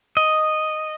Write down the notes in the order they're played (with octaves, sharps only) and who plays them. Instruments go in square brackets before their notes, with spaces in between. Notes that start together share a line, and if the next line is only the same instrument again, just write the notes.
[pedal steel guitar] D#5